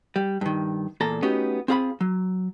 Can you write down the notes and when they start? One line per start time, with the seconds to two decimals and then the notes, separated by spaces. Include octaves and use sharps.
0.16 G3
0.41 G2 D#3
1.00 E2 A#2 A4 A#5
1.22 A3 B3 C#4 D#4 F#4 G4
1.68 C4 F4 G#4 F5 A#5 B5
2.01 F#3